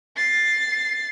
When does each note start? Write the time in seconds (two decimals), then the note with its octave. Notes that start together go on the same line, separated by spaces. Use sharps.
0.16 A6 C7